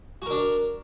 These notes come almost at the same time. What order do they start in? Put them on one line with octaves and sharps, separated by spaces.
F#4 A#4 D4